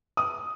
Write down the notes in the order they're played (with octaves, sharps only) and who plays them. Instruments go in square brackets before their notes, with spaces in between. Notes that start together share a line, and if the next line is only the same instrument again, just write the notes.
[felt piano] D#6